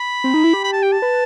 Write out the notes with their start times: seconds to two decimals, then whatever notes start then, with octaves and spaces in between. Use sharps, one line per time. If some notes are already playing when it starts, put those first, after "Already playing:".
Already playing: B5
0.24 C4
0.34 D#4
0.44 E4
0.53 G4
0.64 B5
0.73 A5
0.82 G5
0.92 A5
1.02 B4